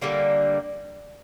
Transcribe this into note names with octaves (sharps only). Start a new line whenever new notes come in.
D3 G3 A#3